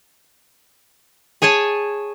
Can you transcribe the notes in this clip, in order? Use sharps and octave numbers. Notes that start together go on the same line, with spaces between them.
G#4 C#5 G#5 A5